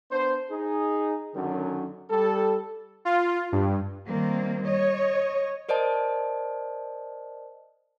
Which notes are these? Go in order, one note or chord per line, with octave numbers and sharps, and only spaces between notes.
B3 D4 C5
D#4 G#4
F#2 D3 D#3 F#3 C#4
G3 A4
F4
G2
D#3 G3 A#3 C4
C#5 D#5
A#4 C5 D5 D#5 A5